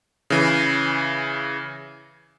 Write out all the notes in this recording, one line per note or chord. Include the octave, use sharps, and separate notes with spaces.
C#3 E3